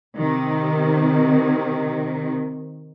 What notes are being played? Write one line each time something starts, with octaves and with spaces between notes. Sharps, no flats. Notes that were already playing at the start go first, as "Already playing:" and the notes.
C3 D#3